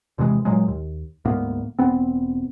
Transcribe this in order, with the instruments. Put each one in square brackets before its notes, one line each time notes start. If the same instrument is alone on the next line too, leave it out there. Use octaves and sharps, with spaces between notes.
[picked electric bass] E2 C3 E3 G#3
A#2 F#3 G#3
D#2
D2 G#2 A#3 B3
E1 B3 C4